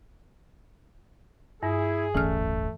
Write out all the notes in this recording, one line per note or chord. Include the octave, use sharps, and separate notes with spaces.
G2 E4 G#4
D1 G1 E3 A3 C#4 F6